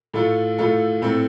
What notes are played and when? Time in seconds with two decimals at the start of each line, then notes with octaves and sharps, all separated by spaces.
0.14 A2 A3 F4 A4
0.58 A2 A3 F4 A4
1.02 A2 A3 C4 A4